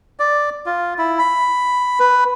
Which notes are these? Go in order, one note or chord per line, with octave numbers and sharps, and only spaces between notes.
D5
F4
E4
B5
B4